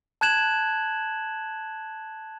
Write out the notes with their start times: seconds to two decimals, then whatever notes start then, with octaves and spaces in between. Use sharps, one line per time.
0.21 A5 F#6 G#6 E7 F#7